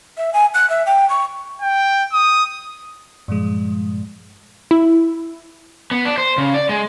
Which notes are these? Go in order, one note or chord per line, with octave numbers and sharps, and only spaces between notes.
E5
G#5
F#6
E5
G5
C#6
G5
D#6
G2 A#2 F3 G#3
E4
B3
D4
C5
C#3
D5
G#3